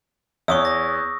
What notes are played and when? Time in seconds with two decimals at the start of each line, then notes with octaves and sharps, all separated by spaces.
0.48 E2 C#5 C#6 D#6 E6
0.65 A#6